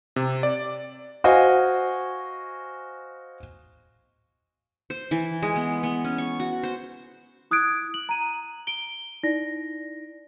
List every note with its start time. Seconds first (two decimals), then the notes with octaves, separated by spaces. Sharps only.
0.16 C3
0.43 D5
1.24 F#4 C5 D#5 F5 G#5
4.90 C5
5.11 E3
5.43 G#3
5.56 B3
5.83 B3
6.04 C#4
6.18 C#6
6.40 F#4
6.63 C5
7.51 E4 D#6 F#6 G#6 D7
7.94 F#7
8.09 A#5 D#7
8.67 D7 G7
9.23 D#4 E4 D5 A#6